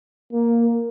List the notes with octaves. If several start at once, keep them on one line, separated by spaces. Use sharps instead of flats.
A#3